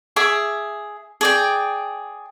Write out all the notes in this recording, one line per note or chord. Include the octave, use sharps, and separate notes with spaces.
G#4 E5 D6
G#4 D5 G5